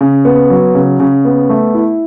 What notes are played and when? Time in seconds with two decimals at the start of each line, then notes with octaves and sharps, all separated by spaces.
0.01 C#3
0.25 B3
0.50 F#3
0.75 C#3
1.00 C#3
1.25 B3
1.50 A3
1.75 E4